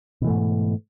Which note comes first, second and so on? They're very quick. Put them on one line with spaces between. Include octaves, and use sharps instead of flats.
B2 E3 A3 G#2